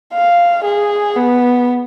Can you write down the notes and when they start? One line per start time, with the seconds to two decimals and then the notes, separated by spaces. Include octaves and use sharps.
0.14 F5
0.64 G#4
1.16 B3